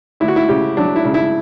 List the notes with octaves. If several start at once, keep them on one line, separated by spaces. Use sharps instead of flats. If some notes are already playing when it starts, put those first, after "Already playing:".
D2 E4
F#4
E4
C#3 G4
F#3 D4
E4
C#3
E4